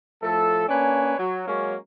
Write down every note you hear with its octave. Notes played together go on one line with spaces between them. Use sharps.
A2 F3 A3 A4
A#3 C#4 D4 B4 C#5 G#5
F#3
F#3 G#3 A#3 C#4